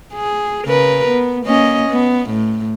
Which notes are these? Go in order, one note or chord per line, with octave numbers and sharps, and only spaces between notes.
G#4
C#3 A#4 B4
B3
A#3 C#4 D#5
B3
A2